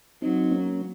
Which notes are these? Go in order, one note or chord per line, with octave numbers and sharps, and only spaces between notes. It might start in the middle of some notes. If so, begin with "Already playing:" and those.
F#3 C4 D#4
A#3 C#4